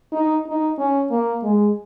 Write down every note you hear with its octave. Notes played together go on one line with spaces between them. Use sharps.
D#4
D#4
C#4
A#3
G#3